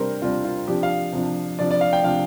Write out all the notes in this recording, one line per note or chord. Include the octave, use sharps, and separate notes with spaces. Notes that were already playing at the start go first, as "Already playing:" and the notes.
Already playing: C3 G3 D4 A#4 C5
C3 G3 D4 F4
F4
C3 F3 D4 G4
F5
C3 F3 D4
C3 F3 D4 D5
D5
F5
G5
C3 F3 D4 F5